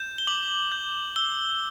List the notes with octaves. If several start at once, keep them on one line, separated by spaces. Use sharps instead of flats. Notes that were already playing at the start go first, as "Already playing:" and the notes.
Already playing: G6 E7
G7
D6 F#7
G6
E6 G7